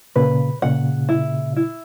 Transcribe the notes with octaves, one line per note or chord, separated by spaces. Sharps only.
A#2 C#3 B4
A#2 C#3 F#5
E4
E4